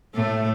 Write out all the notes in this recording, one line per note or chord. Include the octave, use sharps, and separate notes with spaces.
A2 A3